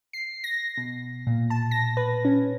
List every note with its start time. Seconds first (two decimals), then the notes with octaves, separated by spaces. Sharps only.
0.13 C7
0.44 A#6
0.77 B2
1.27 A#2
1.50 A5
1.71 A#6
1.97 B4
2.25 C#4